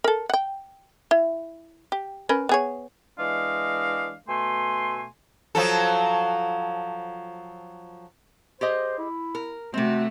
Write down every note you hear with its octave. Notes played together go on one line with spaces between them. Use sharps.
A4 A#4
F#5 G5
E4
G4
C#4 A#4 B4
B3 G#4 C#5
E3 G#3 D4 D#5 F5
B2 A3 G#5 C6
F3 F#3 A4
G4 G#4 C5 D#5
E4
A#4
C3 A3 C4 F#4